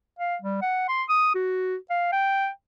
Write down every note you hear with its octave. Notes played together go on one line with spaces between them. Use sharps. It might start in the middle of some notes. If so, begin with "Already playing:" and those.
F5
G3
F#5
C6
D#6
F#4
F5
G5